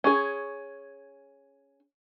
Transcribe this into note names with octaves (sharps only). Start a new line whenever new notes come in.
C#4 G#4